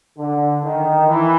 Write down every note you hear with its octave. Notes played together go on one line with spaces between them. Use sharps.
D3
D#3
E3